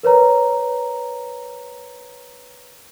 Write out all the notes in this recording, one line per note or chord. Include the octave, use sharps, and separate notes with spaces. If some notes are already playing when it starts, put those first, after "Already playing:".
A#4 B4 C#5 A#5